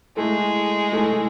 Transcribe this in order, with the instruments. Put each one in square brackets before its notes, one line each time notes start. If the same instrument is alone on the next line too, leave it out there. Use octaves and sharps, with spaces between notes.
[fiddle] G#3 [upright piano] A3 E4 A4
[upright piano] A3 E4 A4